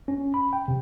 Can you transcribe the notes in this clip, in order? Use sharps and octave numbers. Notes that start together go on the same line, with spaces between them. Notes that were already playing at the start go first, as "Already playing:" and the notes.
C#4
B5
G5
C3